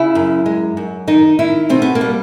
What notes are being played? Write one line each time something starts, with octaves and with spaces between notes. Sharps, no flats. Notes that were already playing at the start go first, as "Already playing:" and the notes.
Already playing: C#3 E4
F#2
G#3
F#2
D#3 D#4
D#3 E4
B2 C4
B3
A#3
G3